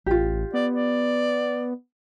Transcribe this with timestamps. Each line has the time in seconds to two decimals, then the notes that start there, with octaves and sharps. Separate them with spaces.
0.06 A1 F4 G4
0.54 B3 D5
0.73 D5